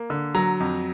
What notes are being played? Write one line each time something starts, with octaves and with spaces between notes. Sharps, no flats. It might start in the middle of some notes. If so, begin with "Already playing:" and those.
Already playing: A#3
D3
F#3 A#5
F2